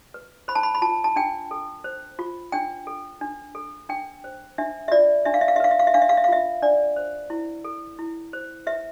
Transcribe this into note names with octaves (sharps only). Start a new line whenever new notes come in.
B4
C5 B5
A5
B5
B5
F4 A5
A5
D4 G5
A4
C5
F4
D4 G5
A4
D4
A4
D4 G5
C5
D4 E5
E5
F4 D5
D4 E5
F5
E5
F5
E5
B4 F5
E5
F5
E5
D4 F5
E5
F5
E5
F5
F4 E5
D4 D5
C5
E4
A4
E4
C5
B4 E5